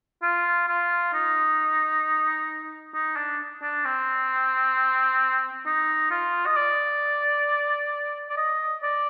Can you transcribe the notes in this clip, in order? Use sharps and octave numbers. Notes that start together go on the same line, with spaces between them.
F4
F4
D#4
D#4
D4
D4
C4
D#4
F4
D#5
D5
D5
D#5
D5